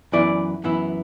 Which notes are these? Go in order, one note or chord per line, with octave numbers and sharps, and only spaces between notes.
F#2 E3 B3 E4 D5
F#2 E3 B3 E4